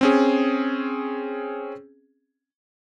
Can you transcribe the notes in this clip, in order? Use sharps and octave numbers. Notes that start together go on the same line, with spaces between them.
C4 C#4 G#4